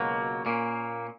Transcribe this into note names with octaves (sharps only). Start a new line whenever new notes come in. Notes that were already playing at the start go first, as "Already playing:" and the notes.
Already playing: C#2 B2 F#3 A#3
A#2 A#3 C#4